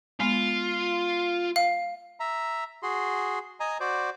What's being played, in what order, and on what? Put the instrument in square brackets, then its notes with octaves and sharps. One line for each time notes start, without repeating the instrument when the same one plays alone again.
[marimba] G#3 B3 [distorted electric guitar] F4
[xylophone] F5
[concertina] E5 A#5
F#4 G#4 C6
D#5 G#5 A#5
F#4 C5 D5